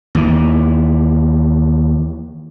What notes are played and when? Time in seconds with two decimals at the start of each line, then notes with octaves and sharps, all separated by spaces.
0.15 D#2 E3